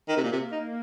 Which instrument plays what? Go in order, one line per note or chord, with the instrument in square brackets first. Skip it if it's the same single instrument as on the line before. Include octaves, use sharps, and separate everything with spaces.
[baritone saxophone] D#3
C3
[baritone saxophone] A#2 [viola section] A#3
[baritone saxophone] C3
D#4